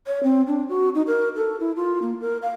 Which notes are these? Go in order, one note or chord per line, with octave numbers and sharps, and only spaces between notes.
C#5
C4
D4
F#4
D#4
A#4
A4
E4
F4
A#3
A#4
F5